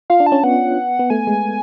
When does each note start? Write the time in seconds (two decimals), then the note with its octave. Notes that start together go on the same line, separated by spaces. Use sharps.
0.10 F4 F5
0.20 D4
0.26 A5
0.32 C#4
0.43 B3 F#5
0.99 B3
1.10 A3 G#5
1.27 G#3